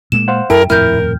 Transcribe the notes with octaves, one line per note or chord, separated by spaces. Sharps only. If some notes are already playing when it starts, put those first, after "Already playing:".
A#2 G#3 A#3 E7
C5 F5 F#5
F#2 E4 A4 A#4 G5
D#1 F2 A2 E4 A#4 F6 G6